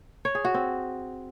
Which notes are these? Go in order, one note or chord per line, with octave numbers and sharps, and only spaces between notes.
C#5
G#4
F#4
C4